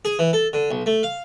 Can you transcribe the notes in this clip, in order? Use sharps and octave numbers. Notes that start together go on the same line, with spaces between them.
G#4
E3
A4
D3
B1
A3
F5